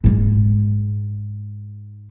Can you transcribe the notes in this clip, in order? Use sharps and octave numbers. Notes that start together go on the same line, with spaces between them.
G#2 G#3